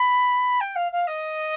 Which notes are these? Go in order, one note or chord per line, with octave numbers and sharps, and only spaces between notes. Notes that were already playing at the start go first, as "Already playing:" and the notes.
Already playing: B5
G5
F5
F5
D#5